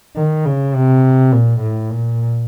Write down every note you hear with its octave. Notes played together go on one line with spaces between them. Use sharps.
D#3
C#3
C3
A#2
A2
A#2